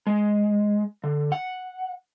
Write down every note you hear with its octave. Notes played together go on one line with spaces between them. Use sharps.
G#3
D3
F#5